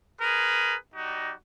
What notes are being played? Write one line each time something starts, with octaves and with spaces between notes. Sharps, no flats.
G#4 A#4 B4
G3 D#4 F#4